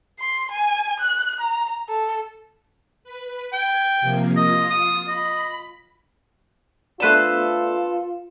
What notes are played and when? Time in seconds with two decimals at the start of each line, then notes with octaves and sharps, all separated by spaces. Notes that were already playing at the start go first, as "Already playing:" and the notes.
0.20 C6
0.52 G#5
1.00 F#6
1.40 A#5
1.89 A4
3.04 B4
3.53 G5 G#6
4.01 C3 F3 A#3
4.37 F4 D#5
4.70 D#6
5.08 D#5 B5
7.00 A3 B3 D4 F4 A4 B4 C5